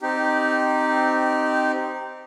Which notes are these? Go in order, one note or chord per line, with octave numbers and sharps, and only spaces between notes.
C4 D#4 G4